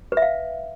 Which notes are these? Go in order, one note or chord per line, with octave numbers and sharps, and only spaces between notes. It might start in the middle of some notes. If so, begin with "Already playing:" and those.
B4
E5
F5